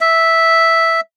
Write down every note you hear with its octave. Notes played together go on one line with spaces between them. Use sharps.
E5